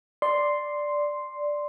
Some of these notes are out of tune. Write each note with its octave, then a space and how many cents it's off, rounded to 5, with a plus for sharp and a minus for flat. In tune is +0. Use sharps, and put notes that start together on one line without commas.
D5 +0 C6 +0